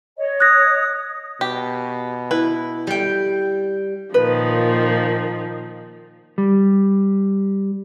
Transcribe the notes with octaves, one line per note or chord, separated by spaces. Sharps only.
C#5 D#5
D#6 F#6 A#6
B2 G4
E4 B4
G3 G5
A#2 D#3 F3 B4
G3